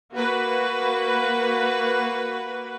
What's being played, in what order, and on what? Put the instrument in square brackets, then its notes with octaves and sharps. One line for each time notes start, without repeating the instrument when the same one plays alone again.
[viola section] A#3 F#4 B4